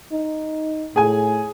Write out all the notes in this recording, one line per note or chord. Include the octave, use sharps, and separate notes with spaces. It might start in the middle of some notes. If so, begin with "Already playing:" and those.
D#4
A2 G#4 G#5